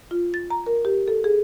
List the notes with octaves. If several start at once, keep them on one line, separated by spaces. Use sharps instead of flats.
F4
A6
A#5
A#4
G4
A4
G#4